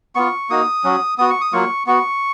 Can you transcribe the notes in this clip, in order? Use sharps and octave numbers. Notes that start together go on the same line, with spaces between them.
B3 F4 C#6
A#3 D#4 F#4 D#6
F#3 C#4 F#4
B3 F#4 D#6
C#6
D#6
F#3 A#3 F4 C#6
B3 F#4 C#6